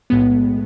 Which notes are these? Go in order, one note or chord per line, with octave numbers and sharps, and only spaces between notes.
B1 A2 G#3 B3